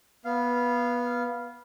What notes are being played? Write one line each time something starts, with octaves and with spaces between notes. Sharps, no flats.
B3 F5